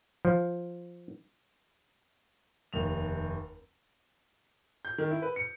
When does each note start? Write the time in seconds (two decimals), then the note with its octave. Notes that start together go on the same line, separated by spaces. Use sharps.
0.25 F3
2.73 F1 D#2 F7
4.85 G6
4.98 D#3
5.10 E4
5.22 B4
5.36 C#7